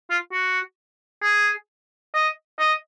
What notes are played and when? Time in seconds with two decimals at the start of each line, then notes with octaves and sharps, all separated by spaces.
0.10 F4
0.32 F#4
1.23 G#4
2.14 D#5
2.59 D#5